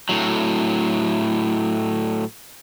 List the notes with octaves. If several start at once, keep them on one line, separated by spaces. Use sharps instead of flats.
A2 F#3